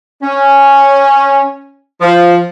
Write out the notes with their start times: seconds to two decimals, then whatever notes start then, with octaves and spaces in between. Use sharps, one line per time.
0.23 C#4
2.01 F3